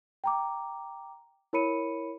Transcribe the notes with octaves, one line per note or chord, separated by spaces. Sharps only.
G5 A#5 D6
E4 A#4 C#5 B5 C#7 D#7